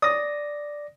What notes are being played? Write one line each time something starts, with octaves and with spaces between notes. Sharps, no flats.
D5 D#6 A#6